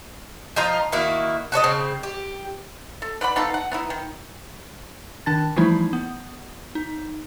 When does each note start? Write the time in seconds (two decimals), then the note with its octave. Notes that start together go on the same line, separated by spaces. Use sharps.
0.56 F3 D#4 F4 A#5
0.92 D#3 A#3 E4 F#4
1.52 F#4 A4 C#5 D#5
1.64 C#3 C4
2.03 G4
3.02 A4
3.21 B4 D5 F#5 B5
3.36 B3 D#4 F4 A4
3.54 F#5
3.71 B3 D#4 E4
3.90 D#3
5.26 D#3 D4 A5 A6
5.56 E3 F3 G3 A3 D#4 E4
5.93 B3
6.75 D#4